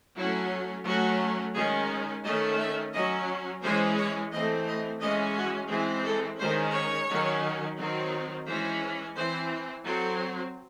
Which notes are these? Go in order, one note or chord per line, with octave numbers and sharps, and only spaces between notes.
F#3 A3 C#4 E4
F#3 A3 C#4 F#4
D#3 G#3 C#4 G#4
D#3 A3 C#4 D#5
E5
F#3 C#4 D#5
E3 G#3 C#4 C5
C#5
E3 A3 C4 D#5
D#5
E3 G#3 C#4 D#5
F#4
E3 G#3 C4 G#4
A4
D#3 G#3 C#4 C5
C#5
D#3 F#3 C#4
D#3 F#3 C4
E3 G#3 C#4 C5
E3 C4 C5
F#3 C4 A4